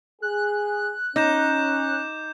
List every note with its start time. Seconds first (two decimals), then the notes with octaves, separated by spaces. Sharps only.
0.22 G#4 F#6
1.16 C#4 D#4 D6 G6 E7